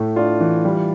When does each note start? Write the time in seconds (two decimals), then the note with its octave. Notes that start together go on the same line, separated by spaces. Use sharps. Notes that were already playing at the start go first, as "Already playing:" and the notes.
Already playing: A2 A3
0.16 D4 F4
0.40 E3
0.65 G3